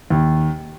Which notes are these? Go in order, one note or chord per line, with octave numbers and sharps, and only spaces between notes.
D#2